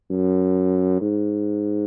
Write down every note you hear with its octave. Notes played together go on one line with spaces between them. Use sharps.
F#2
G#2